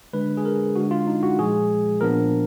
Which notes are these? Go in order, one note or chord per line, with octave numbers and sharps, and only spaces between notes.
D3 G#3 D4 B4
G#4
A#4
D3 G#3 D4 F#4
F4
D#4
F#4
A#2 F3 G#3 G#4
A#2 F3 B3 D4 A#4